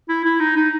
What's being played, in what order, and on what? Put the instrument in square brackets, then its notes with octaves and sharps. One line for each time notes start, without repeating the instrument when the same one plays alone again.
[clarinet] E4
E4
D#4
D#4